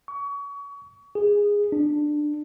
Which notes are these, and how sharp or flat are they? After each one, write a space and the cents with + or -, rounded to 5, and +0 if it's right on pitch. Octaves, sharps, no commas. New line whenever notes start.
C#6 +30
G#4 -15
D4 +15